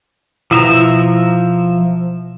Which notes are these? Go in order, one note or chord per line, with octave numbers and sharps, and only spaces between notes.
B2 F3 E4 E5 A#5